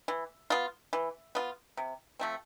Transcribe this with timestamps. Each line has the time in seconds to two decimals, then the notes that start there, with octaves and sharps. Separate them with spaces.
0.08 E3
0.50 B3 F4
0.93 E3
1.35 B3 F4
1.77 C3
2.19 F3 A3 C4